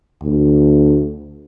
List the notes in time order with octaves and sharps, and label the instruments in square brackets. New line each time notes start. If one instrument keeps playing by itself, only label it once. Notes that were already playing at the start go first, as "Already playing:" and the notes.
[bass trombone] D2